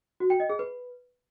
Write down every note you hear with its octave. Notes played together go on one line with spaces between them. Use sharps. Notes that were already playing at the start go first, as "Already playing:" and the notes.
F#4
G5
D#5
G#4
B4